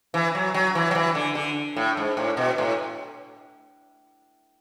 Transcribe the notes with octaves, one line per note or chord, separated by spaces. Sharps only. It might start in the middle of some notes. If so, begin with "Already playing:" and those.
E3
F#3
F#3
E3
F#3
E3
D3
D3
A2
G#2
A2
B2
A2